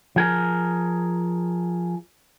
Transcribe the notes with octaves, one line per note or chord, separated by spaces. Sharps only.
F3 G#4 A#4